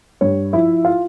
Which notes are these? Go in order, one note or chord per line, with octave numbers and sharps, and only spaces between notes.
G2 C#5
F3 E4 E5
F4 F5